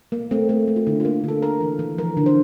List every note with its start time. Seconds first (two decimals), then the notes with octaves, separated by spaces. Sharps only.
0.12 A#3
0.31 A3 C4
0.49 A3
0.68 A3
0.76 F4
0.86 D3 E4
1.00 A#3 F4
1.24 D3 A4
1.42 A#3 A#4
1.61 E3
1.79 E3
1.98 F3 A#4
2.17 D3
2.26 C5